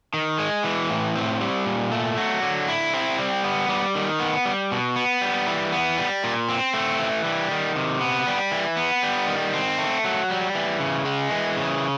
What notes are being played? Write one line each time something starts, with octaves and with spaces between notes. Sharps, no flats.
D#3
G#3
E3
A2
C4
G3
A#2
A3
F#3
D3
E4
C4
G3
B3
G3
D#3
B3
G3
B2
B3
G3
E3
B3
G3
A#2
C4
A3
E3
G3
D#3
C3
B3
G3
E3
B3
G3
D#3
C4
A3
F#3
G3
E3
C#3
G#3
E3
C#3